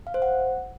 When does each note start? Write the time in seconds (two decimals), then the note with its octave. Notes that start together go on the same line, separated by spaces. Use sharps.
0.07 F5
0.14 C5
0.22 F#5